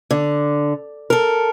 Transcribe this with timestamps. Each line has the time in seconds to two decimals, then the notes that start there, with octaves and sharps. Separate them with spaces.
0.11 D3
1.10 A4 A#4